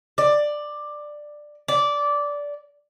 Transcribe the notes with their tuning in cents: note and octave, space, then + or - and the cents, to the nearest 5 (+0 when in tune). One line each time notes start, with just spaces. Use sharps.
D5 +10
D5 -15